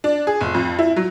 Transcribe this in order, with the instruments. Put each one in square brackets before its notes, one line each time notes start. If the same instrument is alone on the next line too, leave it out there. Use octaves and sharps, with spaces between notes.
[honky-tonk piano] D4
G#4
F1
F2
E4
F#3